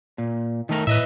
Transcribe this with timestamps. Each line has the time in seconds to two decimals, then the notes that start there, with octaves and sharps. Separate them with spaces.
0.18 A#2
0.69 D#3 A3 A#4
0.87 A2 B4 D#5 E5